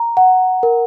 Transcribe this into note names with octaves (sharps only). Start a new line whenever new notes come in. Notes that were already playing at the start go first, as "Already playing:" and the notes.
Already playing: A#5
F#5
A#4